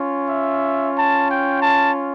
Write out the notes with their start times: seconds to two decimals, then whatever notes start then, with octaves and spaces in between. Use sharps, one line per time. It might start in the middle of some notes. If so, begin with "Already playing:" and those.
Already playing: C#4 F4
0.29 E5
0.96 A5
1.29 G5
1.62 A5